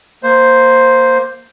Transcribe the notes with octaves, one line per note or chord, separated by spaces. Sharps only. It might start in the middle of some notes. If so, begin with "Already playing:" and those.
A#3 C5